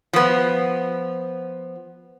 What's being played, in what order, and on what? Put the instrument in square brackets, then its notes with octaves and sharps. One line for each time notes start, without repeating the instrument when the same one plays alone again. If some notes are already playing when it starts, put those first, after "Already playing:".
[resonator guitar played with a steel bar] F3 B3